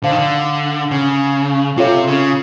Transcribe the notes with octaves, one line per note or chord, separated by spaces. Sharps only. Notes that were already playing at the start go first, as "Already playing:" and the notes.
D3 C5 F5 A5
D#3
D3
C#3
C3 F4 A4 C#5 F5
C#3